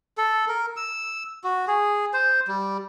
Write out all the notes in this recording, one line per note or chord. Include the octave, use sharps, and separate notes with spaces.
A4
A#4
E6
F#4
G#4
C5
G3